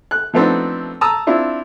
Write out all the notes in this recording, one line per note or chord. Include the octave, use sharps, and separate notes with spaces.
F#6
F3 A3 B3 C4 D4 D#4
A5 A#5 D#6 E6
C4 D4 E4 F4